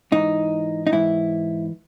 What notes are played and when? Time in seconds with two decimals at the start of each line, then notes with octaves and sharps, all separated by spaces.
0.12 G#2 E3 D#4
0.87 D#4
0.92 G#2 E3 E4